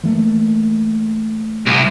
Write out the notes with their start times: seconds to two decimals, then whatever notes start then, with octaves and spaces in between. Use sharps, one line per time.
0.03 E3 A3 A#3
1.66 C2